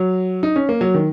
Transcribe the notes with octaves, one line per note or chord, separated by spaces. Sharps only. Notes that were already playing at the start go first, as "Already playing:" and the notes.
Already playing: F#3
D#4
C#4
A#3
F#3
D#3